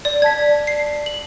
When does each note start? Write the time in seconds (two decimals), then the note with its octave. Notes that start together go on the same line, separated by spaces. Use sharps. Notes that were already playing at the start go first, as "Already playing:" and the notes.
0.05 D5
0.22 D5 A5 G#6 B6
0.67 C7
1.06 F#7